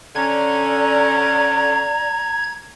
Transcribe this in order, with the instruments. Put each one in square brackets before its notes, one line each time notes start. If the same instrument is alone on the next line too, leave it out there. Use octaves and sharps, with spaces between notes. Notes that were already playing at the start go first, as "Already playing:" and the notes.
[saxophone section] D3 C#4 [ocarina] D5 [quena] A#5 [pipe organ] G#6